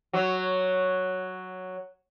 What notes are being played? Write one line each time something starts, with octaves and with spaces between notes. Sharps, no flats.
F#3 C#5